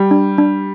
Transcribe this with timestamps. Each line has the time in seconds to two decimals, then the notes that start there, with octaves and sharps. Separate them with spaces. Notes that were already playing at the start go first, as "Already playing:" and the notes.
Already playing: G3
0.11 D4
0.38 D4